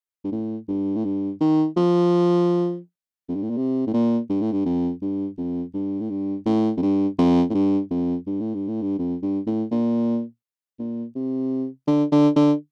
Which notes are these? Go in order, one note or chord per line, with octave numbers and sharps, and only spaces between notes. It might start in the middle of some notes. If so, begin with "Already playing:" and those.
G2
A2
G2
A2
G2
D#3
F3
F2
G2
A2
A#2
C3
A2
A#2
G2
A2
G2
F2
G2
F2
G2
A2
G2
A2
F2
G2
F2
A2
G2
F2
G2
A2
G2
A2
G2
F2
G2
A2
A#2
A#2
C3
D3
D3
D3